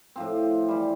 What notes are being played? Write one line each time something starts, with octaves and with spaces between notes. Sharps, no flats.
A2 F3 C4
E3 G3